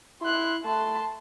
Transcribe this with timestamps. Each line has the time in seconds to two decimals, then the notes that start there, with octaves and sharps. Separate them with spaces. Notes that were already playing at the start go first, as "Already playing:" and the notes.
0.22 E4 C6 F#6
0.65 A3 A5 C6